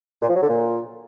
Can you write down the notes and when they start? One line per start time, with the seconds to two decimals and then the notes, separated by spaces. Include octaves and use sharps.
0.22 A#2
0.29 F3
0.36 F#3
0.42 D3
0.49 A#2